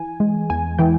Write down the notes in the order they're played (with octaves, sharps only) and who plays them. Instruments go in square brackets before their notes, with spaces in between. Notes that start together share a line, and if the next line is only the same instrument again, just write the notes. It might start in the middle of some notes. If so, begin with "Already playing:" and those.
Already playing: [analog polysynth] E3 G#5
G#3
E2 G#5
E3 G5